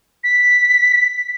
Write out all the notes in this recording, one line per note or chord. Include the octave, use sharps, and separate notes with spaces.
B6